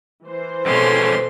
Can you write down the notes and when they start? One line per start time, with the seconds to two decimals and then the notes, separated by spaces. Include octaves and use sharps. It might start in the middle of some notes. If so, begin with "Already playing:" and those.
0.25 E3 C5
0.66 F2 B2 G#3 C#4 A4 C6